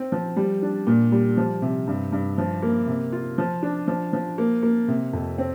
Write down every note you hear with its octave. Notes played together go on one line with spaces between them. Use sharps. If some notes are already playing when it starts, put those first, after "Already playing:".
Already playing: C4
F3
G3
D4
A#2
G3
F3
C3
G2
G2
F3
A#3
C3
F4
F3
D4
F3
F3
A#3
A#3
C3
F2
C4